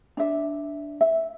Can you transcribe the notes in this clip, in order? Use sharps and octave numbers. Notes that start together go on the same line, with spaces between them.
D4 E5
E5